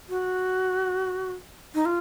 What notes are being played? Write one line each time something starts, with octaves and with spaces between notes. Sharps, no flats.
F#4
D#4
F4